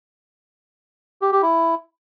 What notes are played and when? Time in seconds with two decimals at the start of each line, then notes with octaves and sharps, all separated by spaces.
1.22 G4
1.32 G4
1.42 E4